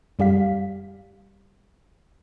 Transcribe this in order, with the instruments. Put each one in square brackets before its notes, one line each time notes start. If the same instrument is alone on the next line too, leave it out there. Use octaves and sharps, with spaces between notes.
[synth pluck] F#2 G3 G4 F5 B6